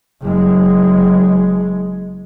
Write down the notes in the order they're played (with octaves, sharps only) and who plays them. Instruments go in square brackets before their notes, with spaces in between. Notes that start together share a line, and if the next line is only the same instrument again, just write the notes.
[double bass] F#1 G#3